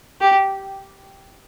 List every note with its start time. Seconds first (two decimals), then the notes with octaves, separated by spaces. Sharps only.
0.21 G4